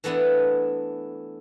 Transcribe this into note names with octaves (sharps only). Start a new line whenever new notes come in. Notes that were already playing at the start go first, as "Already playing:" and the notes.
E3 A3 B3 D4 E4